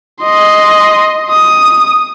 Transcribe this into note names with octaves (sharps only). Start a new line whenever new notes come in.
D#5 C6
D#6